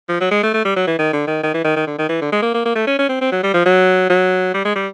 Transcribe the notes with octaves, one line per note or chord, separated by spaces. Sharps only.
F3
F#3
G#3
A3
A3
G3
F#3
E3
D#3
D3
D#3
D#3
E3
D#3
D#3
D3
D#3
E3
D3
G#3
A#3
A#3
A#3
A3
C#4
C#4
C4
C4
F#3
G3
F3
F#3
F#3
G3
G#3
G3